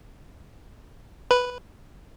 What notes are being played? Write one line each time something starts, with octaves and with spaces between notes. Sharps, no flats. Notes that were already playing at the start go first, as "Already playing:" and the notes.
B4